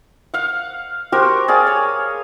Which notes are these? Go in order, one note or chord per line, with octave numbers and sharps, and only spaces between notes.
F5 F#5
F#4 G4 A#4 C5
G#4 D5 F5
C#5